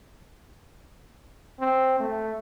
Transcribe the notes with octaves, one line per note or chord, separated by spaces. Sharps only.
C4
A3